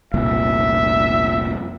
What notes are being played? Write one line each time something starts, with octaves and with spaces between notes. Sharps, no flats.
F1 C2 A#2 E5